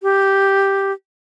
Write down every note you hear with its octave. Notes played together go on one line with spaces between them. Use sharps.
G4